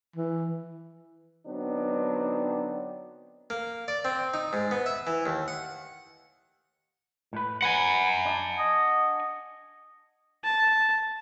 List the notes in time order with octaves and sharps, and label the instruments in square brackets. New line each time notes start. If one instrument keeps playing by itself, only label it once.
[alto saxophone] E3
[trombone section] D3 F#3 B3 C4 D4 D#4
[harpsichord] A#3
D5
C4
D#4
G#2
B3
E5
E3
D#2
F#5
[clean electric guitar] A2 B4
[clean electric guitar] B4 [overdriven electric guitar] F#5 G#5
[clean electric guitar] D4
[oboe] D#5
[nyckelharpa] A5